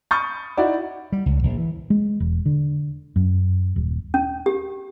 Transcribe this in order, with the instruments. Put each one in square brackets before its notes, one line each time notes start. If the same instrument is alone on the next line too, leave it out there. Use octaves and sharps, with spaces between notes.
[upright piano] B5 C#6 D#6 F6 G6 A6
D#4 E4 F#4 D5 E5
[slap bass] G3
C#2
A#1
E3
[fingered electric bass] G#3
E1
D3
F#2
D#1
[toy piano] C#4
G4